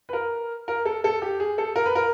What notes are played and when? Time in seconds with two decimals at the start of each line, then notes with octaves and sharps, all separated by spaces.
0.09 B4
0.13 A#4
0.68 A#4
0.85 A4
1.04 A4
1.22 G4
1.40 G#4
1.58 A4
1.76 A#4
1.85 B4
1.95 A#4